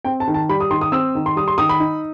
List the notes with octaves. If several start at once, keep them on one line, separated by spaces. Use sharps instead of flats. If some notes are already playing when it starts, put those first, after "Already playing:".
C4 G5
A5
D#3
A5
G3 B5
D#6
D#3 C6
D#6
C4 E6
D#3
C6
G3 D#6
C6
D#3 D#6
B5
D#4